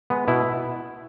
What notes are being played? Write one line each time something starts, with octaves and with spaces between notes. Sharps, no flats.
G#3 B3
B2 E4